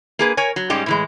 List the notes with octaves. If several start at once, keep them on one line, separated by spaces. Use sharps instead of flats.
A#3 G#4 B4
A#4 C#5 G#5
F#3
G#2 G3 G#3 C#4 G4
A2 E3 G#3